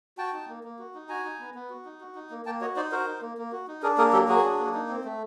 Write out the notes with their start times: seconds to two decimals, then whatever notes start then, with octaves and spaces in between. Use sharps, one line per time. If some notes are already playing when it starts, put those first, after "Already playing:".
0.18 F#4 G5 A5
0.33 D#4
0.48 A#3
0.64 A#3
0.79 F#4
0.94 D#4
1.09 F#4 G#5 A#5
1.24 D#4
1.39 B3
1.55 B3
1.70 F#4
1.85 D#4
2.00 F#4
2.15 D#4
2.30 A#3
2.46 A#3 G5 A5
2.61 F#4 C#5 D#5
2.76 D#4 C5 D5
2.92 F#4 A#4 C5
3.07 D#4
3.22 A#3
3.37 A#3
3.52 F#4
3.68 D#4
3.82 D4 G#4 A#4
3.98 A#3 G#4 A#4
4.13 F#3 G4 A4
4.28 F#3 F#4 G#4
4.44 D4
4.59 A#3
4.74 D#4
4.89 C4
5.04 A3